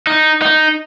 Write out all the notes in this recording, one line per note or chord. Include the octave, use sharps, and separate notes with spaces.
D#4
D#4